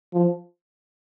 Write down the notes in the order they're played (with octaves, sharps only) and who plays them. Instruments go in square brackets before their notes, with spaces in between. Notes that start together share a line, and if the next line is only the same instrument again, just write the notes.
[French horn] F3